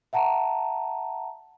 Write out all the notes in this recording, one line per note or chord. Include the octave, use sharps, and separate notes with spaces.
E5 F#5 A5 A#5